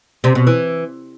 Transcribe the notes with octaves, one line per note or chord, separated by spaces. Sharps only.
C3
B2
E3